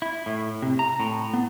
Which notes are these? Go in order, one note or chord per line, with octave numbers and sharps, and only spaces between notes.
E4
A2
C3
A#5
A2
B3